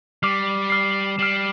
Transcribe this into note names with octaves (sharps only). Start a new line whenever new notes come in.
G3 D6 F6 C7
D6 F6 C7
G3 F6 C7 E7